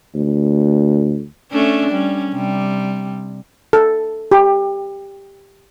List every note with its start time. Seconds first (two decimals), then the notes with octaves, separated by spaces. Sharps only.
0.14 D2
1.51 A3 C#4 D4
1.91 G3 C#4
2.33 C3 G3
3.73 A4
4.31 G4